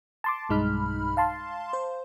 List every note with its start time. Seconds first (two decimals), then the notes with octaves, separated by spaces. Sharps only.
0.24 A5 C6 D6
0.49 B1 G2 G#3 D#4 B5 F6
1.17 F5 A5 C6
1.73 C5